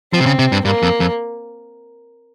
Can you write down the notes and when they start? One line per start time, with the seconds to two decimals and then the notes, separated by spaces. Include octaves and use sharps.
0.13 F3 C4
0.20 C3
0.26 C#3
0.39 C3
0.52 G2
0.65 G2 A#3
0.83 F2
1.00 F2